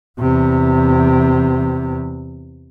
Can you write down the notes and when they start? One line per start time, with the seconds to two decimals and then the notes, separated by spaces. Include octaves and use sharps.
0.19 E2 C3